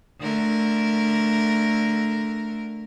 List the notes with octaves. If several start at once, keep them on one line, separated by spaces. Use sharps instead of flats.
D3 A3 A#4